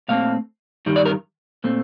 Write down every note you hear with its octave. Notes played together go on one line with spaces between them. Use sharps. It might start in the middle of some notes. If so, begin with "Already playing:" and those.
A#2 A3 C4 F5
G2 D#3 G3
D5
A#4
A#2 A3 C4